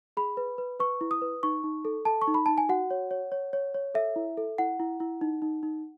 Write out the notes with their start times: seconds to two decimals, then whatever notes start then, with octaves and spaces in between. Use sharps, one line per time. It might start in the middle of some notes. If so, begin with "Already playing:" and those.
0.17 G#4 B5
0.37 B4
0.58 B4
0.80 B4 C#6
1.01 E4
1.11 D#6
1.22 B4
1.43 D#4 C#6
1.64 D#4
1.85 A4
2.05 A4 A5
2.22 C#6
2.28 D#4
2.34 B5
2.46 D#4 A5
2.58 G#5
2.69 F#4 F#5
2.91 C#5
3.11 C#5
3.32 C#5
3.53 C#5
3.74 C#5
3.94 A4 E5
4.16 E4
4.37 A4
4.58 E4 F#5
4.80 E4
5.00 E4
5.21 D#4
5.42 D#4
5.63 D#4